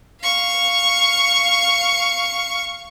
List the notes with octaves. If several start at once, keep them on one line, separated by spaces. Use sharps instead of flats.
F5 C#6